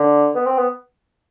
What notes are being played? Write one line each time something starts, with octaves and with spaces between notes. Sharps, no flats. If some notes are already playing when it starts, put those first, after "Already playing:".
Already playing: D3
B3
C4
B3